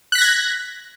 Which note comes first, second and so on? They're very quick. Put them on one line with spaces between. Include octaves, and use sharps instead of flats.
F#6 B6 A#6 G#6